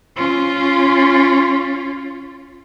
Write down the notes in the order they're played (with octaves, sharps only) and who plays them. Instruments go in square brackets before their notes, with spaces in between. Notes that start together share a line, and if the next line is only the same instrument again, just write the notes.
[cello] C#4 F4